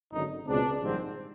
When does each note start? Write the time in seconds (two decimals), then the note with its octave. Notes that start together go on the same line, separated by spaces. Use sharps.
0.12 G#1 F#2 D3 D#4
0.47 C#2 B2 G#3 C4 D4
0.82 A#1 G#2 D#3 G3 C4